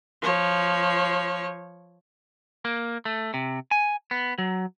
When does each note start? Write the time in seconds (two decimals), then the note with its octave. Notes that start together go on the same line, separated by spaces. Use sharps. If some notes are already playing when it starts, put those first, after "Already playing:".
0.22 F3 C#5
2.65 A#3
3.05 A3
3.34 C3
3.71 G#5
4.11 B3
4.38 F#3